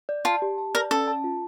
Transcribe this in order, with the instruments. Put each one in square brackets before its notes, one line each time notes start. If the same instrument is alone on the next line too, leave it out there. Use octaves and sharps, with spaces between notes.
[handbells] D5
[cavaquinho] F4 [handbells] A5
[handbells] G4
A5
[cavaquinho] A#4 [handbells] D5
[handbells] C#4 [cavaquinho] A4
[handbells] A5
F4